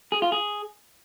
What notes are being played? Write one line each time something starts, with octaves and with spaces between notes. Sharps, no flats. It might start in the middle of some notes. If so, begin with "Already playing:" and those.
G#4
F4
G#4